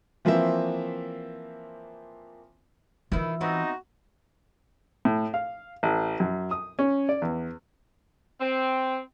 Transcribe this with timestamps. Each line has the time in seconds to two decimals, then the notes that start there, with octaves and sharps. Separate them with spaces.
0.25 E3 F3 A#3 C4 E5
3.12 D#3 E3 E4 F4
3.41 B3 C4 D#4 F#4
5.05 A2
5.34 F5
5.83 A1
6.20 F#2
6.51 D#6
6.79 C#4
7.09 D5
7.22 E2
8.40 C4